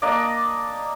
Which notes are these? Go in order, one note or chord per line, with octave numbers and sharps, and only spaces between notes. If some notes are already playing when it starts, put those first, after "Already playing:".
A#3 D4 D5 D#5